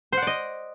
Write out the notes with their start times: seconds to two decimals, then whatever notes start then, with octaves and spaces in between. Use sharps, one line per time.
0.12 C5
0.17 F#5
0.22 D5
0.27 D#5